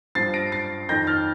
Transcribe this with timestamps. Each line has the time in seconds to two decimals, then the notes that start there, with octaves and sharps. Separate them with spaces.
0.15 G2 F3 A6 C7
0.34 A#6 D7
0.52 A6 C7
0.89 F2 D#3 G6 A#6
1.07 F6 A6